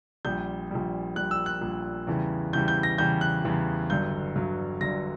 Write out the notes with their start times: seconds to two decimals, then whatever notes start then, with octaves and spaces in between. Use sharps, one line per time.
0.25 A#1 A#2 G3 G6
0.71 A#1 A#2 G3
1.16 A#1 A#2 G3 F#6
1.31 E6
1.46 F#6
1.61 A#1 A#2 G3
2.07 E2 C#3 E3 G3
2.53 E2 C#3 E3 G3 G6
2.68 G6
2.83 A#6
2.98 E2 C#3 E3 G3 G6
3.21 F#6
3.44 E2 C#3 E3 G3
3.90 G1 G2 D3 F#3 G6
4.36 G1 G2 D3 F#3
4.81 G1 G2 D3 F#3 A#6